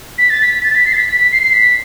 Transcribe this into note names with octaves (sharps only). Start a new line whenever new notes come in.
B6
A6
B6
A6
B6
C7
A6
B6
B6
B6
C7
C7
B6